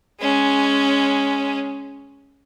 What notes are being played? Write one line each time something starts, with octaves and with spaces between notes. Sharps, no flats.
G#3 C#4